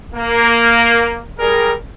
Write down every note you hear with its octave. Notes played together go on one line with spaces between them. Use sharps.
A#3
G3 G#4 A#4